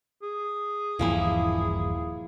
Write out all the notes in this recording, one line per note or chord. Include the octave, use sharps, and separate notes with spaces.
G#4
D#1 G2 E3 F3 A#3 E4